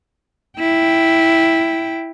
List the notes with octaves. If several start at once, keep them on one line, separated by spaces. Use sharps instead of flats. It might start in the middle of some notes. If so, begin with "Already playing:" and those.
E4 G5